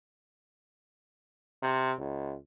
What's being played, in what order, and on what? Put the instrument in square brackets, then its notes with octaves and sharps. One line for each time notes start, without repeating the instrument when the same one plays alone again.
[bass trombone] C3
C#2